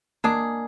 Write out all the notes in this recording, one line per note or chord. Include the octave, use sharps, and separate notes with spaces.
G#3 A#3 D4 G#4